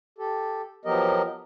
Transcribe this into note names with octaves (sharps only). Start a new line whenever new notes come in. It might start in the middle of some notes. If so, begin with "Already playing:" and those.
G4 A4
F3 F#3 B3 G4 A#4 D#5